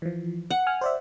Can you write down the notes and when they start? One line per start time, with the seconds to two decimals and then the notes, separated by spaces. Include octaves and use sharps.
0.02 E3 F3
0.51 F#5
0.67 G#5 F6
0.81 C5 D5 E5